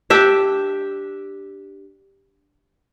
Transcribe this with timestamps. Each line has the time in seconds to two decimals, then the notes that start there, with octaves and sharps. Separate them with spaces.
0.10 D4 G4 E5